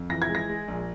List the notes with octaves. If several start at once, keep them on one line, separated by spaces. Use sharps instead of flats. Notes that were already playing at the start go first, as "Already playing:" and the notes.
Already playing: F2
E3 A#6
G#6
G#3
A#6
G#3
A#1